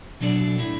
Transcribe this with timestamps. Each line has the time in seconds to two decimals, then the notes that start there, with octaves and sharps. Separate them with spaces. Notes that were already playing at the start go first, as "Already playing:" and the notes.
0.21 B2 F#3 D4 A4 D5
0.58 A2 A3 E4